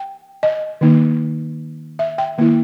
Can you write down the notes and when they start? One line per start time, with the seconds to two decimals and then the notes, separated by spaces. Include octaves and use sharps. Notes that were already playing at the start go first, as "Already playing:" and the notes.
Already playing: G5
0.43 D#5
0.81 D#3 A#3 D#4
1.99 E5
2.18 G5
2.38 D#3 A#3 E4